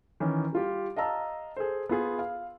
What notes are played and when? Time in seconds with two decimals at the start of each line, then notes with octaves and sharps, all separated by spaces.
0.20 D#3 E3 C#4
0.52 G3 F4 G4
0.96 D#5 F5 A5 A#5 E6
1.57 G#4 A4 C5
1.89 B3 F4 G#4
2.19 F5